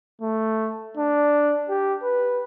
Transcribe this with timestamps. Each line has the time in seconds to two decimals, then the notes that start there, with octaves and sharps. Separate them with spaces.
0.22 A3
0.97 D4
1.70 G4
2.03 B4